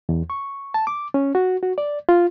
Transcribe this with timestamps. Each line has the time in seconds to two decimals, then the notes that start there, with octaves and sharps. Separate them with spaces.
0.09 E2
0.30 C#6
0.74 A5
0.87 D6
1.14 C#4
1.35 F#4
1.63 F#4
1.78 D5
2.09 F4